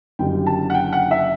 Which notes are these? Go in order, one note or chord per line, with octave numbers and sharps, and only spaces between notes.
F#1 F#2 D3 G3 G5
A5
F#5
G5
F#5
E5